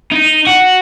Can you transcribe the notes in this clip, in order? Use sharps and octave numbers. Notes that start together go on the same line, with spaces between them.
D#4
F#4